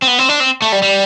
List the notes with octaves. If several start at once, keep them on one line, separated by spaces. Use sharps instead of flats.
C4
B3
C4
D4
C4
A3
G3
G3